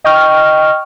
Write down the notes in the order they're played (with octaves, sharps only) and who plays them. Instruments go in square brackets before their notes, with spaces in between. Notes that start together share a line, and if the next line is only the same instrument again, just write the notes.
[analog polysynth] D#5 G5 C#6 F6